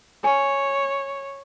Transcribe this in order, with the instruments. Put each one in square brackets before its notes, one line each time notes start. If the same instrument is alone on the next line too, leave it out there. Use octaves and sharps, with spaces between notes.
[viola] C#5 [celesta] G#5